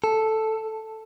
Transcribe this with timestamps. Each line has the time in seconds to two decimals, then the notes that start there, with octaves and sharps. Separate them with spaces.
0.04 A4